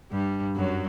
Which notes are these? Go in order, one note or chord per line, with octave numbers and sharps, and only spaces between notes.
G2 G3
F#2 F#3